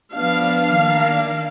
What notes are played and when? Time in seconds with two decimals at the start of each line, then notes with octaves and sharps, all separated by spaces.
0.14 F3 B3 D4 F5
0.74 D#3 A#3 D4